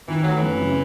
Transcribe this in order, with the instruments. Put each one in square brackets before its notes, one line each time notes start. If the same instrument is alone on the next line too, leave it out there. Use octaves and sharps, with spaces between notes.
[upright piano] D#3 [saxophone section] E3
[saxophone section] F#3 [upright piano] A3
[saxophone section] E3
[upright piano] F#2
C#3